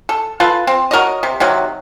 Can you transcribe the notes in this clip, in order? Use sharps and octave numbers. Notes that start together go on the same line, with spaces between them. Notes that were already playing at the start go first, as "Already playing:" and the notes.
A4
F4 A4 B4
C4
F#4 A#4 C#5 D#5
C3
C3 D#3 F#3